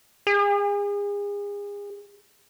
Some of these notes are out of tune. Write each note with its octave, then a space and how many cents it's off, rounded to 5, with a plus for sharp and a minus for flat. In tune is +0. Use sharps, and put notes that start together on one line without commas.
G#4 -35